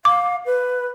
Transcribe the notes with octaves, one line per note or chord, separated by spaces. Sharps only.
F5 D6
B4